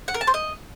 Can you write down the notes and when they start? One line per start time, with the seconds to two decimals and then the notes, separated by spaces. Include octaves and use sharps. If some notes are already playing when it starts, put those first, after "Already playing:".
0.08 F#5
0.14 A#4
0.21 A5
0.27 C5
0.34 D#5